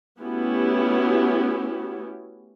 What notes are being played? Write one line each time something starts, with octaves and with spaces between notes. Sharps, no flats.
A3 B3 C#4 E4 F#4 G4